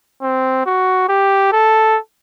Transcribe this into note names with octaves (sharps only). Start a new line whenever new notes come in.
C4
F#4
G4
A4